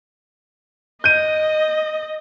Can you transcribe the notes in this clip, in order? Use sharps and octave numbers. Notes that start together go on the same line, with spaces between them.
D#5 G6 D#7